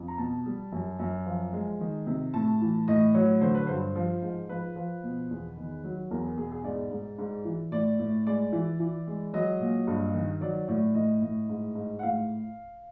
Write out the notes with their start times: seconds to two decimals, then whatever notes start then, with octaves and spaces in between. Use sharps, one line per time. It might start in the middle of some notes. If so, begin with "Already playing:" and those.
Already playing: F2
0.08 A#5
0.18 B2 A5
0.46 G3
0.72 F#2
0.99 F#2
1.26 F3
1.53 G#3
1.81 D#3
2.07 C3
2.34 A2 A5
2.61 E3
2.88 A2 D#5
3.14 F#3 C#5
3.41 D3 C5
3.55 B4
3.67 G2 C5
3.95 F3
4.22 G#2
4.49 F3 B4
4.76 F3
5.03 B2
5.31 E2
5.57 D#3
5.84 F#3
6.11 E2 A#4
6.24 G#4
6.37 B2 G#4
6.52 G#4
6.64 G#2 D5
6.91 G#2
7.18 G#2
7.45 E3
7.72 A2 D5
7.99 A2
8.26 G#3 D5
8.53 E3
8.80 E3
9.07 G#3
9.34 F#3 D#5
9.60 A#2
9.87 G2
10.14 D#3
10.41 F#3 D5
10.68 A2 D5
10.95 A2 D#5
11.22 A2
11.49 G#2
11.75 G#2
11.99 F#5
12.03 A2 F5